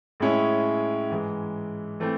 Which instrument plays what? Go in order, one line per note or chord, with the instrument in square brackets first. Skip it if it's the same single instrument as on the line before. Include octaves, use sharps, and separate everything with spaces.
[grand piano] A2 G#3 C#4 E4 G#4
G#2 E3 G#3
E3 A3 C4